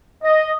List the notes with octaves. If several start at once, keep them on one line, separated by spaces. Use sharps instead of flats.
D#5